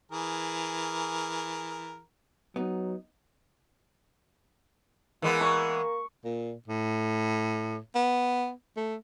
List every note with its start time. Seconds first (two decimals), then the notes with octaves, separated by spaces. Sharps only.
0.12 E3 G#4 A#4
2.56 F#3 B3 D#4
5.22 E3 G#3 A#3 B3
5.41 A#3 C#6
6.25 A#2
6.68 A2
7.95 B3
8.77 A3